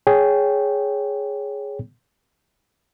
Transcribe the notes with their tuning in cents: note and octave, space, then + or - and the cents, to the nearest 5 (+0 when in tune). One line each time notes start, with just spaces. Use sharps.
G#4 +0 C#5 +5 G5 -10